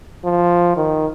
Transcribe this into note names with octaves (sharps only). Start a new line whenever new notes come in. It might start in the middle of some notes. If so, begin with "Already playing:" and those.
F3
D#3